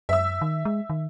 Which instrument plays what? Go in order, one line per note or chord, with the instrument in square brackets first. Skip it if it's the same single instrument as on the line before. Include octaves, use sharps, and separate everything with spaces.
[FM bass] F#2 [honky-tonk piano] E5 E6
[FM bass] D#3
G#3
D#3